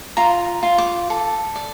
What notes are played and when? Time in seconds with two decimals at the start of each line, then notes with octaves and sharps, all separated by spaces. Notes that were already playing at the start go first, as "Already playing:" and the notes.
0.17 F4 A#5
0.63 F4
0.78 D6
1.10 A4
1.56 D5